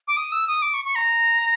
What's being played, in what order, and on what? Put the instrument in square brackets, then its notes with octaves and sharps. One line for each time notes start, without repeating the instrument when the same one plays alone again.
[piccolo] D6
D#6
E6
D#6
D6
C#6
C#6
A#5